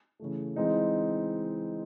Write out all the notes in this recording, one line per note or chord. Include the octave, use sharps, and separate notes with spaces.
C#3 E3 A3
E3 G#3 C4 D#4